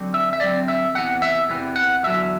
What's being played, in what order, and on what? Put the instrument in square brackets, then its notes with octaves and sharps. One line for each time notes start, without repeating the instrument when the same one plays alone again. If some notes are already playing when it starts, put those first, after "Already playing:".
Already playing: [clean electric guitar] D3 F#3 C4
E5
E5
D3 F#3 C4 D5
E5
E2 C3 E3 B3 F#5
E5
E2 C3 E3 B3
F#5
E2 D3 F#3 E5